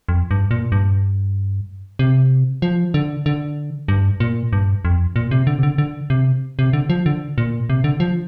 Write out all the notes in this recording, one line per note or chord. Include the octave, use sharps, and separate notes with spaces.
F2
G2
A#2
G2
C3
F3
D3
D3
G2
A#2
G2
F2
A#2
C3
D3
C3
D3
D3
C3
C3
D3
F3
D3
A#2
C3
D3
F3